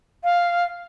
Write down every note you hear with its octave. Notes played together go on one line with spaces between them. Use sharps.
F5